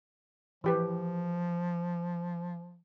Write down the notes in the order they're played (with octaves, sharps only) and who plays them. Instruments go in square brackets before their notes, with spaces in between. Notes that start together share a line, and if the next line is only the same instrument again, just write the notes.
[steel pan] E3 G4 B4 [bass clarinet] F3